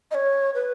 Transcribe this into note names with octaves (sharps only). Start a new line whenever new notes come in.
D#5
C#5
B4